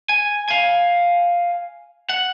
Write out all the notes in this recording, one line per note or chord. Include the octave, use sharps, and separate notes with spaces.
G#5
F5 G#5
F#5